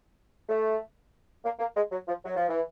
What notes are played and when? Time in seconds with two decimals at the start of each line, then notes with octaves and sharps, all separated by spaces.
0.48 A3
1.44 A#3
1.59 A#3
1.76 G#3
1.91 F#3
2.07 F3
2.24 F#3
2.36 F3
2.48 E3